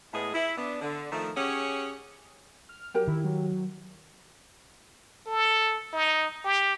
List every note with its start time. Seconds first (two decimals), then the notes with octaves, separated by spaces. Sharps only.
0.13 A2 G#3 A3 B3 G#4
0.35 E4
0.58 B3 D4
0.82 D3
1.12 D#3 F3 A3
1.37 C#4 G4 G#4 C#5 F#5
2.69 F6
2.94 F#3 G4 A#4 G5
3.07 D#3 E4
3.24 F#3
5.27 A4
5.93 D#4
6.45 G4